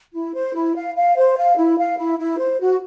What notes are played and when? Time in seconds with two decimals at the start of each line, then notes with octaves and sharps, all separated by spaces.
0.13 E4
0.34 C5
0.54 E4
0.75 F5
0.95 F5
1.16 C5
1.37 F5
1.56 E4
1.78 F5
1.98 E4
2.19 E4
2.39 C5
2.60 F#4